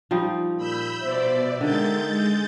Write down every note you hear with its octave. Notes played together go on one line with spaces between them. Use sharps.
F3 G3 D#4
A#2 B5 E6 G6
B2 C5 D5 E5
D3 D#3 G#3 G6 A6